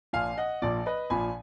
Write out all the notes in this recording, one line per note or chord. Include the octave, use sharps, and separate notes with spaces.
A#1 A#2 F3 F5 G#5
D#5 F#5
A#1 A#2 F3 D5
B4 D#5
A#1 A#2 F3 G#5 B5